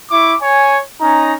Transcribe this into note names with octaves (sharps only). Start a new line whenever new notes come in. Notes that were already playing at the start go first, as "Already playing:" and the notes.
E4 C#6 D6
C#5 G#5
C#4 D#4 A#5